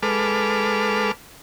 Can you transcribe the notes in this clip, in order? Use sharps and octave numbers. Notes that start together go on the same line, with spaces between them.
G#3 A4 B4 D6 F6